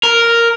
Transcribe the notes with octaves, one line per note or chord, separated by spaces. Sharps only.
A#4